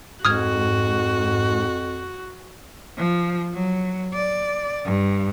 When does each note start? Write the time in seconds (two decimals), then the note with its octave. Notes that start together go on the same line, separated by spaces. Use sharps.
0.25 F2 G#2 F#4 D#6 F6 G#6
2.97 F3
3.53 F#3
4.13 D5
4.85 G2